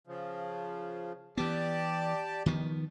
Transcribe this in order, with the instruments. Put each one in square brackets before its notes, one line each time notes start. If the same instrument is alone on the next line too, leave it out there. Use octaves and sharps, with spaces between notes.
[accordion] C#3 F3
[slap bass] E3 B3 [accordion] G4 D5 A5
[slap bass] D#3 F3 B3